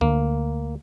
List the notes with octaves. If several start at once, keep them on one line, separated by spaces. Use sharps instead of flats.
D2 A#3